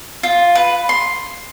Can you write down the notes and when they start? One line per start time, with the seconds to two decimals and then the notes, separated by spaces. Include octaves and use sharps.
0.23 F4
0.55 B4
0.89 C6